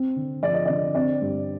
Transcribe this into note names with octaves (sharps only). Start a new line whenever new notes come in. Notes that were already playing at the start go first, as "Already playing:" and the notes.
Already playing: C4
D3
F3 D5
D#5
D3 D5
C4 D5
G2